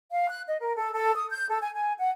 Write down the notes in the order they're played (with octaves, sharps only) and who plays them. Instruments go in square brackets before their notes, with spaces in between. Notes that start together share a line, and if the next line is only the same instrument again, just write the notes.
[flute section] F5
F#6
D#5
A#4
A4
A4
D#6
G6
A4
G#5
G#5
F#5